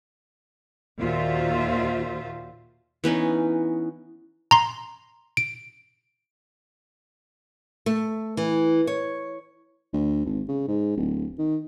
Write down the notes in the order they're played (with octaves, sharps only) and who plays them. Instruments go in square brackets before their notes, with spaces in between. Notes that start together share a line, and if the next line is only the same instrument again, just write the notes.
[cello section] D#2 A#2 F4 F#4 C5 E5
[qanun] E3 B3 C#4 D#4
[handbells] A#5 C6
D7
[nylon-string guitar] A3
E3
C#5
[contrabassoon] D2
G#1
C#3
G#2
D1
D#3